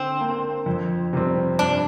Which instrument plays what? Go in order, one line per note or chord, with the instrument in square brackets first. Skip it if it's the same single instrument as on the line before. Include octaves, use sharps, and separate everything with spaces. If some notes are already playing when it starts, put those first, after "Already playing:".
Already playing: [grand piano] D3 [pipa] C4
[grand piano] A#3 D4
F2
C3 G3 C4
[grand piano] G2 [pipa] D4